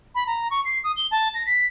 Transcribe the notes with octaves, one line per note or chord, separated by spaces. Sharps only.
B5
A#5
C#6
C7
D#6
G7
A5
A#6
B6